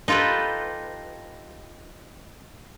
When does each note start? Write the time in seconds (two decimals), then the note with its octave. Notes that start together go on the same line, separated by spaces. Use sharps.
0.08 D#4 F4 G4 A4 B4